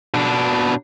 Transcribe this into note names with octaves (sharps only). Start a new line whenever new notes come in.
B2 D4